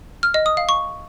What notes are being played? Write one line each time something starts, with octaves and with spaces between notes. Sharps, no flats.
F6
D#5
D#6
F5
C#6